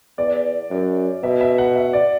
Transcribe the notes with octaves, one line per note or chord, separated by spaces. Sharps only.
E2 D5
F#2
B2 E5
E5
F#5
E5
D5